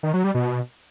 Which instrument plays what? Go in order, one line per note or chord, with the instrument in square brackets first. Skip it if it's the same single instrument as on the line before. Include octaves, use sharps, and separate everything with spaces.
[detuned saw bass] D#3
F#3
G3
B2